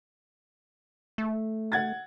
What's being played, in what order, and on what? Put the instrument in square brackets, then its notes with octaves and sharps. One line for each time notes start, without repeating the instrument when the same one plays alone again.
[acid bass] A3
[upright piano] F#5 G#6 A6